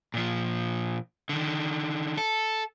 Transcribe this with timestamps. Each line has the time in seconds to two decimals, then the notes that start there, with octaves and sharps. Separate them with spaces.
0.14 A#2 F3
1.29 D3 D#3
2.17 A4